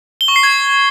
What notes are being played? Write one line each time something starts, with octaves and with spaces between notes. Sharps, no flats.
G7
C#6
C7
G#6